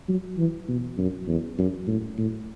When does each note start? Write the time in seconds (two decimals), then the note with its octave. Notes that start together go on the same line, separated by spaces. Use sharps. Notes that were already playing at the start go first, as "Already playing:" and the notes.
0.08 F#3
0.38 E3
0.68 B2
0.98 F#2
1.27 E2
1.58 F#2
1.87 A2
2.18 A2